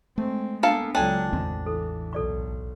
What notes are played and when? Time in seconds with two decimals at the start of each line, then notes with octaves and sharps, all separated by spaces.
0.18 G#3 A3 C4
0.63 A#3 B3 D4 A4 F5
0.95 C#2 F#3 D4 A4 G5 G#5
1.33 A1 E2 D#3 C4
1.66 E3 A4
2.13 B1 A4 D5 C#6